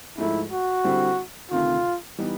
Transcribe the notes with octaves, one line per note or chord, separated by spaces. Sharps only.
G#2 F3 A3 E4
F#4
D3 G3 C4 E4
D2 C3 D#3 F4
E3 G3 B3 D#4